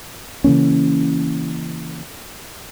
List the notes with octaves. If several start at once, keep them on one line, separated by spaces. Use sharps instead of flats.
C#3 E3 A#3 C#4